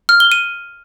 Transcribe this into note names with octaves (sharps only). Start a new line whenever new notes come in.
F6
G7
D#7